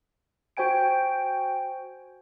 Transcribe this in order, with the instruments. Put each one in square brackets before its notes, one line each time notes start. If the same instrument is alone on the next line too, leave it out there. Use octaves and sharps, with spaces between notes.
[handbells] F#4 C5 G5 G#5 D7